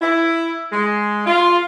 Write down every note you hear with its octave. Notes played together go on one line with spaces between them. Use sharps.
E4
G#3
F4